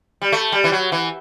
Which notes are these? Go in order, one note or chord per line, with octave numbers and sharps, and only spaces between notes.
G3
A3
G3
E3
F#3
E3